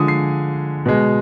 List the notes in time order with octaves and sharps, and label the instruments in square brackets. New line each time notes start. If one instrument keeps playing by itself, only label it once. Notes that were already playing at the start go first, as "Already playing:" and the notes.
Already playing: [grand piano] D3 F3 G#3 G#5 D#6
C7
B2 G#3